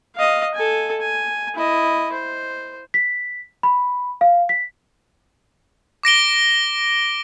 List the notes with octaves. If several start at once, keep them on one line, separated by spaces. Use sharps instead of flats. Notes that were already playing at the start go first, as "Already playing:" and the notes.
D#5 F5
A4 G#5
G#5
E4 D#5
C5
B6
B5
F5
B6
D6 A#6 D7 G7